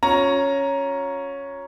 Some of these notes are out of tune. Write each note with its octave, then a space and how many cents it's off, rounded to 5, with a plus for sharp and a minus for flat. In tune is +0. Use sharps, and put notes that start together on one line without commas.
C#4 +0 F4 +40 A#5 +5